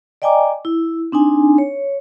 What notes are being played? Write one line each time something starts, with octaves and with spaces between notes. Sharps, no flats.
D5 D#5 G5 G#5 A#5 D6
E4
C4 D4 D#4 G#5
C#5